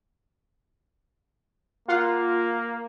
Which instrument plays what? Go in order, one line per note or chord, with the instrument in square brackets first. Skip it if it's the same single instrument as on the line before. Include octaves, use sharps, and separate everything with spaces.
[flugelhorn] A#3 [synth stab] F4 F#5